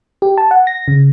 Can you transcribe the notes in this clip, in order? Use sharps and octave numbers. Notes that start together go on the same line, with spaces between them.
G4
A5
F#5
A#6
C#3